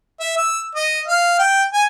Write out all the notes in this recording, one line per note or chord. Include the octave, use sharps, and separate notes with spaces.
E5
E6
D#5
F5
G5
G#5